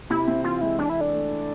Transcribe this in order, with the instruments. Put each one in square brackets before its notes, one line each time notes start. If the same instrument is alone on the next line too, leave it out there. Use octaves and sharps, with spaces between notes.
[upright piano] C3 [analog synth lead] E4
[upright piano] C4
[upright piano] E3 [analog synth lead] F4
[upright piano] G#3 [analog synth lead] E4
[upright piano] E3 [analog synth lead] D4
[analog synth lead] E4
[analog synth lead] D4 [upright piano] A4
[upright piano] A3
E4